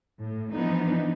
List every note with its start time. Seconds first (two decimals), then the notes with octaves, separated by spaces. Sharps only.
0.20 A2
0.52 E3 F3 B3 D4 D#4